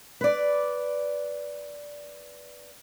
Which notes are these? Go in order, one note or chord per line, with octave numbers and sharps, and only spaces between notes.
B4 D5